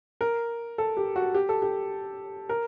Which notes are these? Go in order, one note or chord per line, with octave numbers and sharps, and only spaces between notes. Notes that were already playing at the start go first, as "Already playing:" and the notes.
A#4
A4
G4
F#4
G4
A4
G4
A#4